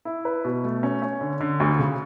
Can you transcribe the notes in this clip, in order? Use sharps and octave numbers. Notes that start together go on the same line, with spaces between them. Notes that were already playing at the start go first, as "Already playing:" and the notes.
E4
B4
B2
A3
C#4
C#4
D3
D3
D2
C#3